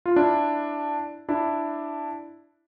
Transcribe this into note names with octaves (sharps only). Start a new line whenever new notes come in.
F4
D4 E4
D4 E4